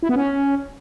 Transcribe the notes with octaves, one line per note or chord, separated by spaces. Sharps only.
E4
B3
C#4